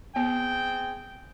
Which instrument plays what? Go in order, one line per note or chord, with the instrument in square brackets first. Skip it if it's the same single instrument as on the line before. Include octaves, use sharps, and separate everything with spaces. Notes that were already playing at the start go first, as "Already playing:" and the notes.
[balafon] B3 [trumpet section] C4 G#4 G5